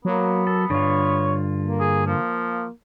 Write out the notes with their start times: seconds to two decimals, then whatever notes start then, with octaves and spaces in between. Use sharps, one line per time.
0.05 F#3 A#3 B3
0.47 A4 A#4
0.70 G2 D3 F4 C#5
1.61 A#3
1.80 G#4
2.06 F3 A#3